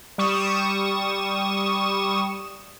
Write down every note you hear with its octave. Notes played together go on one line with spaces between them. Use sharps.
G3 C#6 D#6 E7